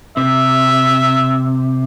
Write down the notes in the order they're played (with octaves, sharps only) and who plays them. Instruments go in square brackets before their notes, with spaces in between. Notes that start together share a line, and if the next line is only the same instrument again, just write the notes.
[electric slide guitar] C3 [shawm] E5